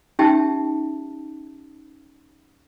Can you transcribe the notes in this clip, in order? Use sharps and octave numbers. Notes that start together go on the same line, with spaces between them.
C#4 D#4 G4 E5 G5 A5